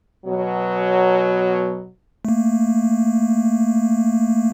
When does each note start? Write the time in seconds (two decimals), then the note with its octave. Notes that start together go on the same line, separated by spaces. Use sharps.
0.25 B2 F#3
2.25 A3 A#3